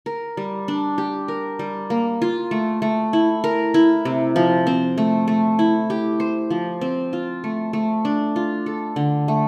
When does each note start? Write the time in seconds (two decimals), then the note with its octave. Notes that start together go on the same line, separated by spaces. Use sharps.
0.06 A#4
0.37 G3
0.68 D4
0.98 G4
1.28 A#4
1.59 G3
1.90 A#3
2.22 F4
2.51 A3
2.82 A3
3.13 E4
3.44 A#4
3.74 E4
4.05 C3
4.36 F3
4.67 C4
4.98 A3
5.28 A3
5.59 E4
5.90 G4
6.20 C5
6.50 F3
6.81 C4
7.13 F4
7.44 A3
7.73 A3
8.05 D4
8.36 F4
8.66 A4
8.96 D3
9.28 A3